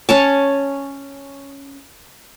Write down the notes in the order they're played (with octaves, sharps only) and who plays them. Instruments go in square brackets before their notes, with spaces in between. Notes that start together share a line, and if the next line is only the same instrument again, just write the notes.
[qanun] C#4 C#5 A5